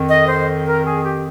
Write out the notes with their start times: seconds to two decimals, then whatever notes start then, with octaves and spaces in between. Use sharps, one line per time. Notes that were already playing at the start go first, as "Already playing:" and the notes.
Already playing: F2 D#3
0.09 D#5
0.28 C5
0.65 A#4
0.85 G#4
1.04 G4